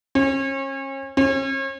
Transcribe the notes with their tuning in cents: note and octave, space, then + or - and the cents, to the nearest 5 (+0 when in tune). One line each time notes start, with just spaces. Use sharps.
C#4 -35
C#4 -40